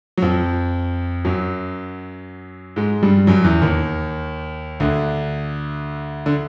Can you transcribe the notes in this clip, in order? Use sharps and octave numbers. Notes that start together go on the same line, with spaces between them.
F#3
F2 F3
F#2 F#3
G#2 G#3
G2 G3
F#2 F#3
E2 E3
D#2 D#3
D2 D3
D3